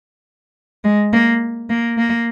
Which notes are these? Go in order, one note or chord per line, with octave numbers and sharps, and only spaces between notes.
G#3
A#3
A#3
A#3